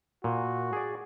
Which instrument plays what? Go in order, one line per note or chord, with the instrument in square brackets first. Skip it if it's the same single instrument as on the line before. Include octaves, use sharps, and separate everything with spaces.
[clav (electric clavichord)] A#2 [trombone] F#4
[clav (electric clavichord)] G#4 D5